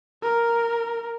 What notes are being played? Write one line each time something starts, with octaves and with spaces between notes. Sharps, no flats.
A#4